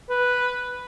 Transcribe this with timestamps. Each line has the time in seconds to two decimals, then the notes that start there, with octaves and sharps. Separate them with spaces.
0.10 B4